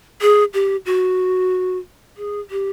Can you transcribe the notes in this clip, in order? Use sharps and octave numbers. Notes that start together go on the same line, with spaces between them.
G#4
G4
F#4
G#4
G4